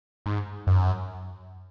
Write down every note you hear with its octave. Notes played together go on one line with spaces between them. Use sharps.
G#2
F#2